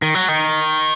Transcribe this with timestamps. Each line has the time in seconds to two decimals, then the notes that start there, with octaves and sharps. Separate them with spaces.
0.02 D#3
0.15 F#3
0.29 D#3